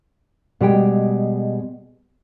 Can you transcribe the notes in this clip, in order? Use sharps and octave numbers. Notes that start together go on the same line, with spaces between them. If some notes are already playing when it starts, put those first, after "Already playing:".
B2 G3 G#3 G5